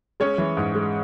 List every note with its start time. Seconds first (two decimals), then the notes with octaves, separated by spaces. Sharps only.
0.20 G#3 C#4 C#5
0.38 E3
0.57 G#2
0.75 G#3